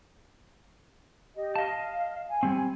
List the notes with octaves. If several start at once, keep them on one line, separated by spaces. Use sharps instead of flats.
G4 D#5
D#5 F5 A5
G#5
G3 C4